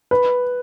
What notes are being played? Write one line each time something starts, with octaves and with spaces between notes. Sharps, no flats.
B4